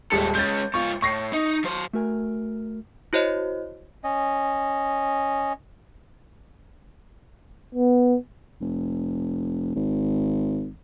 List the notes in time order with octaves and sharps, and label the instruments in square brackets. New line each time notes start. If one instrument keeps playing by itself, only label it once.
[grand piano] D#1 G3 G#3 [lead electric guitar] G#2 A4
[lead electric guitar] G#3 C#4 [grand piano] G6 A6
[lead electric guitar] G#2 F4 [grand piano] C#6
[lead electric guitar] A2 [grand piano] C#6 A#6 C7
[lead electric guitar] D#4
F#3 C5
[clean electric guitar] A3 F#4 A#4 G#5
[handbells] E4 F#4 C5 C#5 D#5
[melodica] C#4 D#5
[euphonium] B3
[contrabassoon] F1
G#1